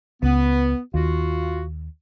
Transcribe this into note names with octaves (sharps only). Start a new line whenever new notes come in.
C#2 B3
D#2 F4 F#4